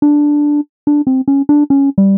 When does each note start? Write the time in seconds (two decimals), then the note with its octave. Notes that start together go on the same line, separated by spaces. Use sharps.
0.02 D4
0.87 D4
1.07 C4
1.28 C#4
1.49 D4
1.70 C#4
1.98 G3